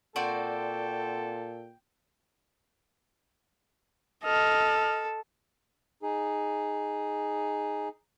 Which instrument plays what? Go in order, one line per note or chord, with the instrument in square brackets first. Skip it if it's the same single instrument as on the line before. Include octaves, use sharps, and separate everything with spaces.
[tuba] A#2 [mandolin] C4 F#4 D5 [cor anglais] A4 [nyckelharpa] G5
[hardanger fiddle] A4 [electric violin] D#5 F6
[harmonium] D#4 G#4